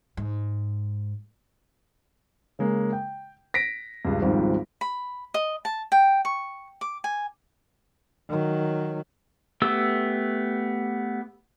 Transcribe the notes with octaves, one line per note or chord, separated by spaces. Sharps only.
G#2
C#3 G#3 A#3
G5
A#6 B6 D7
C#2 G2
G#1 C#2 G#2 F3 G3
B5
D#5
A5
G5
C#6
D6
G#5
D#3 F#3
A3 B3 G4 E6